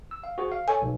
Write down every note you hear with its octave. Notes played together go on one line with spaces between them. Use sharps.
E6
F5
F#4 G#4 C5
F5
A4 C#5 G#5
B1